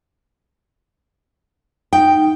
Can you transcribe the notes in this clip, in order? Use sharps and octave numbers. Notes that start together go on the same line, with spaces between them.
D#4 G5